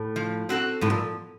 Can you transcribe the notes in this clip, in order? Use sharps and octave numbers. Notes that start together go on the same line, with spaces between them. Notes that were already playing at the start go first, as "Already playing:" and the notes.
Already playing: A2
F3
C4 F#4 A4
A2 F3
A#2